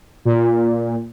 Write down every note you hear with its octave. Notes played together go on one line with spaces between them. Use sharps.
A#2